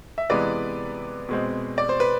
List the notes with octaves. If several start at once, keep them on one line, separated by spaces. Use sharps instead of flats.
E5
C3 E3 G#3 B3 B4 D5
B2 G#3 C4
D5
C5
B4